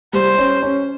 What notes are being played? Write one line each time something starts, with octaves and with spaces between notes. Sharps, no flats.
G3 C5
C#4
C#4